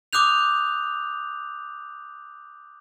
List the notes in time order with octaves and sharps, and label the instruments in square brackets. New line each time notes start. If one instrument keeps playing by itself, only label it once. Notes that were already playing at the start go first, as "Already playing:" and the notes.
[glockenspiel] D6 D#6 F#6 G6 F7